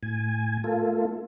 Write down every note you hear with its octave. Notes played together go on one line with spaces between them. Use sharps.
A2 G#5
A3 A#3 F4 A4